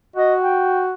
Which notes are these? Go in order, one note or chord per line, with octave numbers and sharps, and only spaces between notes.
F#4 D#5
G5